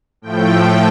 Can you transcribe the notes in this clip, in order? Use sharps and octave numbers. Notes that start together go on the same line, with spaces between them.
A2 F3 A3 G5